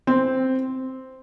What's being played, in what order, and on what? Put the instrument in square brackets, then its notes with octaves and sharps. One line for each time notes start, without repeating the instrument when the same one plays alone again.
[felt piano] C4